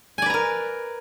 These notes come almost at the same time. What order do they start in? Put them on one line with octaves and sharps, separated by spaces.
G#5 D5 B4 A#5 A#4